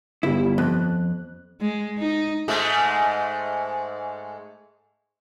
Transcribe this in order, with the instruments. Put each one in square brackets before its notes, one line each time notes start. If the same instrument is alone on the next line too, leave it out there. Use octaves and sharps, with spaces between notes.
[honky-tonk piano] G1 G3 [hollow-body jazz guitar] E4
[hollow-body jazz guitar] F2 [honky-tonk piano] F#6
[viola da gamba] G#3
D#4
[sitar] G#2 G#3 A3